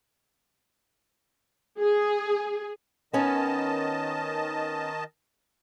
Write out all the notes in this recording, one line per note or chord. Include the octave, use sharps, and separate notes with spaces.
G#4
D#3 B3 C#4 D#5 A5